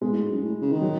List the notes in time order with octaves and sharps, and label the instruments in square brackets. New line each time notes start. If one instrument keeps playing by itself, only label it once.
[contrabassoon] B2 [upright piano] G#3
[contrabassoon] A2
G#2
F#2
A2
C#3
D#3
[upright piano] F#3